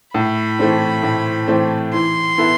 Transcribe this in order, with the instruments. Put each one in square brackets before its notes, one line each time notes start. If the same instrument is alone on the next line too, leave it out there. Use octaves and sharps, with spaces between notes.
[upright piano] A2 [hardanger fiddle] B5
[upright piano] E3 A3 C4
A2
E3 A3 C4
[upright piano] E3 [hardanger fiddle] C6
[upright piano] B3 E4 A4